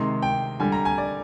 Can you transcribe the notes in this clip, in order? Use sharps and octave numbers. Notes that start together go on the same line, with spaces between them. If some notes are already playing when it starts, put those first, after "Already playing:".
Already playing: C3 D#3 G#3 C6
G5
D3 G3 G#5
A#5
G#5
D5